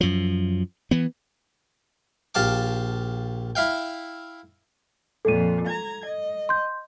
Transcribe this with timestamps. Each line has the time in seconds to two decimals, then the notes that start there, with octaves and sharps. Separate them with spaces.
0.01 F#2 F3
0.91 E3 B3
2.35 A#1 G4 F5 A5 D6
3.55 E4 E5 F5 G5
5.25 F2 A#2 A4 D#7
5.68 A#5 G#6
6.06 D#5
6.49 C6 G6